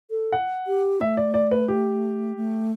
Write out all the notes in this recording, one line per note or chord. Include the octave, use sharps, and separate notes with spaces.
A4
F#5
G4
A3 E5
D5
D5
B4
G4
A3